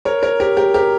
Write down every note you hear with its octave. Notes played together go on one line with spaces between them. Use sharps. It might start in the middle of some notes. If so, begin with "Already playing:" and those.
A#4 C#5
A#4 C#5
G4 A#4
G4 A#4
G4 A#4